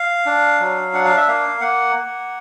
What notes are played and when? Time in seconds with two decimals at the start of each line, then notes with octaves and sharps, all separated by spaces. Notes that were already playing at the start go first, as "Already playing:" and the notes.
Already playing: F5
0.26 D4
0.60 F#3
0.93 D4 F#5
1.05 F5
1.17 E5
1.27 A#3 F5
1.61 A#3 F#5
1.96 A#3